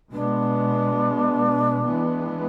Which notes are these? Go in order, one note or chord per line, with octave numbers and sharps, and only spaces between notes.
B2 G#3 B3 D4
E3 G#3 B3